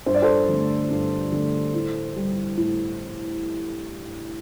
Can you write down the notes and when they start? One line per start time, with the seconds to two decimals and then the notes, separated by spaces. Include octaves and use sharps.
0.06 G2 C5
0.14 D5
0.22 A4 C5
0.49 D3 A3
0.91 G2
1.32 D3 A3
1.74 A2
2.16 G3
2.57 A2